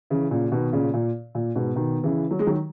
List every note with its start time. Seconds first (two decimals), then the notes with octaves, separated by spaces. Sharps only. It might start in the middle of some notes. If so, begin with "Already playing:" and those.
0.10 C#3 E3
0.31 A#2 C#3
0.52 B2 D#3
0.73 A#2 C#3
0.94 A#2
1.35 A#2
1.55 G#2 B2
1.76 B2 D#3
2.03 C#3 E3
2.31 F#3
2.39 G#3
2.47 D#3 F#3